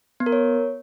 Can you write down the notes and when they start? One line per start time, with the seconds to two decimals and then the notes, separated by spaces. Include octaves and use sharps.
0.20 B3
0.26 A#4
0.32 C#5